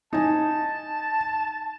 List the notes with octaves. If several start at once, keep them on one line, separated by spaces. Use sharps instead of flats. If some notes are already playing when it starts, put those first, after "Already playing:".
D#4 G#5 A5